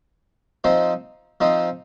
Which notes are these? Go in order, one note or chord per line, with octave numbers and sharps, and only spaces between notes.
F3 C4 D#4 C5 D#5
F3 C4 D#4 C5 D#5